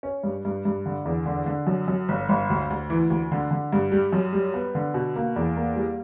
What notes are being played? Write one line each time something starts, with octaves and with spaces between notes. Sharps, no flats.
C#4
G2
G2
G2
D3
E2
D3
D3
F#2
F#2
G1
G1
D2
D2
E3
D2
D3
D3
G2
G3
F#2
G3
B3
D3
B2
A#3
E2
A#3
G3